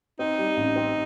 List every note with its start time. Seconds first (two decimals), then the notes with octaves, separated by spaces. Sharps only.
0.19 C4 D#4
0.38 G3
0.57 A1
0.76 C4